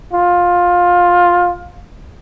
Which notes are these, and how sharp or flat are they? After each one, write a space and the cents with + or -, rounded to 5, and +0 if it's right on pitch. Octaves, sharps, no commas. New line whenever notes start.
F4 +15